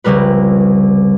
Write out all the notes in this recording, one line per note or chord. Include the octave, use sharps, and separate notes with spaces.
F1 C2 C#3 G3 A#4 B4